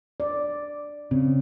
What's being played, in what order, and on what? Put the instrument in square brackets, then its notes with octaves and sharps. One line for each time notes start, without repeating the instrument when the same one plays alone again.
[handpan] D5
[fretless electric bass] C#3 [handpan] C4